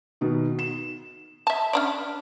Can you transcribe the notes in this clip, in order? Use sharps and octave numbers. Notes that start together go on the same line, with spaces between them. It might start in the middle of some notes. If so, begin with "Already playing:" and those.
B2 D#3
E7
E5 A5
C#4 D4 D5